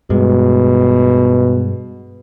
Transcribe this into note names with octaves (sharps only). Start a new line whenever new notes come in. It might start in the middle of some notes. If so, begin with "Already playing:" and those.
G2 B2 G#3